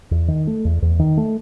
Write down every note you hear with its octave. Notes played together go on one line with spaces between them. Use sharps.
E2
D#3
A3
E2
E2
D#3
A3